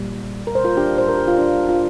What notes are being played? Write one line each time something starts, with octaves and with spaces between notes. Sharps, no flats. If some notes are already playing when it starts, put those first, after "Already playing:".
Already playing: A#2 G3 A#3
A#4
C5
F4 A#4
D4 G4
C5
A#4
G4
F4
D4
F4